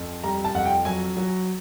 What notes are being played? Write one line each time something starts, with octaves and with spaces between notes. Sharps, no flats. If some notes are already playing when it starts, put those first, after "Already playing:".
Already playing: F2
G3 A#5
A5
F2 F#5
G5
F#3 G#5
F#3